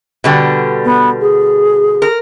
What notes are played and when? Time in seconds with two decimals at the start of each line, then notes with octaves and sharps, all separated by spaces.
0.24 B2 D3 G3
0.84 B3
1.20 G#4
2.02 A#4